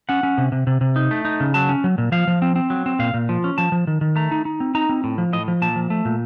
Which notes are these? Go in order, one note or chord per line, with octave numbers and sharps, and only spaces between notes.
C#4 F#5
C#4
C3
C3
C3
C3
D#4
A3
D#4
C#3
F#3 A5
C#4
F#3
A#2
F3 F5
F3
C4
C4
F#3
C4
A#2 F5
A#2
F3
C#4
F3 A5
F3
D#3
D#3
A3 A#5
D#4
D#4
C4
D#4 A#5
C4
A2
F3
A2 D#5
F3
A#2 A5
F3
A3
A#2